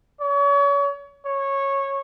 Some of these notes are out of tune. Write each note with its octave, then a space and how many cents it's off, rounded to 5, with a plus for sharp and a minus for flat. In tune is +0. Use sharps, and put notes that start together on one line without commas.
C#5 +35
C#5 -15